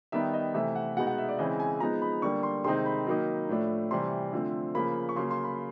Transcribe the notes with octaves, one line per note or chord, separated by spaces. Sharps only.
D#3 G3 B3 D#4 E5
D#5
C3 E3 A3 E5
F#5
B2 G#3 B3 D#4 F#5
F#5
E5
D5
C#3 E3 G#3 C4 E4 D#5
G#5
F3 G#3 B3 D#4 A#5
B5
D3 G3 A#3 C#6
C6
C3 D#3 G#3 C4 D#4 C6
B5
D#3 F#3 A#3 D#4
A2 F3 A3 D4
C3 E3 G3 C6
D3 F3 A3 C4
C#3 F3 A#3 B5
C#6
C#3 F#3 A#3 C6
C6
B5